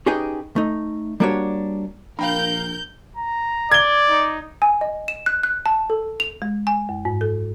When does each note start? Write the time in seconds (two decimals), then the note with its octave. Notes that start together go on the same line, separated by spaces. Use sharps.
0.06 C#4 D#4 G4 G#4 B4 G5
0.56 A3 D#4
1.20 G3 A#3 D4 F#4 G4 C#5
2.19 A#1 D4 A#4 F5 G5 A#5 G6
3.17 A#5
3.72 D5 G#6 G7
4.10 D#4
4.62 G#5
4.81 D#5
5.08 E7
5.26 F#6
5.43 F#6
5.66 A5
5.90 A4
6.20 F7
6.42 G#3
6.67 G#5
6.89 F#2
7.05 G#2
7.21 A4